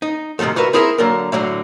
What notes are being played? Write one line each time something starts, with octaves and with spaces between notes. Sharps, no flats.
D#4
G#2 C3 D#3 F3 A3
C2 F#4 A#4 B4 E5
C4 E4 G#4 A#4 D5 E5
D3 F#3 A#3 A#4
A2 D3 F#3 A3